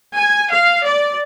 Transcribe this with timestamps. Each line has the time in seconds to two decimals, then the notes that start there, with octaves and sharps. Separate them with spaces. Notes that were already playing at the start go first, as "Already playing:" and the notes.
0.15 G#5
0.49 F5
0.84 D5